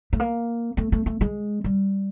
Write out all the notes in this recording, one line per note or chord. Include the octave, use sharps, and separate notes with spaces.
A3
A#3
A3
A3
A3
G#3
G3